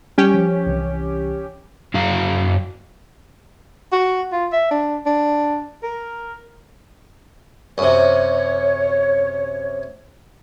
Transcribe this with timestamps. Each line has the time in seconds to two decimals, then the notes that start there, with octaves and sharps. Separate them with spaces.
0.18 G3 C#4 G4
0.34 F3
0.66 C2 E3
1.94 F#2 F#3 F5 A#5
3.92 F#4
4.32 F4
4.53 E5
4.71 D4
5.06 D4
5.83 A#4
7.78 F#2 C3 C#5